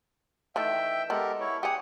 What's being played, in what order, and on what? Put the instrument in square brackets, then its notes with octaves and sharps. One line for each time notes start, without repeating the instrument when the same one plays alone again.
[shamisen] D#3 E3 A3 [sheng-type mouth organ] E5 G5
[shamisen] G#3 B3 [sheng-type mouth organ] G4 A4 A#4
[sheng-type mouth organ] E4 C#5
[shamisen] G4 G#4 [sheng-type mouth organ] F#5 D#6